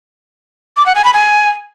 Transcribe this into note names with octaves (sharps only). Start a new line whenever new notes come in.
D6
F#5
G#5
B5
G#5